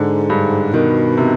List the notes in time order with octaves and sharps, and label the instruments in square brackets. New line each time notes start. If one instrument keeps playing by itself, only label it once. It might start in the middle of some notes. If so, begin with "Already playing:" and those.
Already playing: [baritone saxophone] G#2 [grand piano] D3
[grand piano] G2
[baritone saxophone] B2 [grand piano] D#3
[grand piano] C3